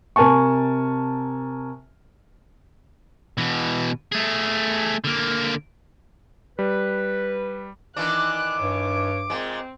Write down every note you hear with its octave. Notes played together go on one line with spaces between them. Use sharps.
C3 A#4 G#5 A5 C#6
B2 E3
A3 G#4
D3 A#3
G3 B4
D#3 E3 D4 D6 F#6
G2 C#5
A#2 G#3 C4